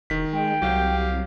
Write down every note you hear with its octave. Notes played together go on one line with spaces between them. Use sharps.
E1 D#3 B6
G#3 G5
C2 F#3 G4 F5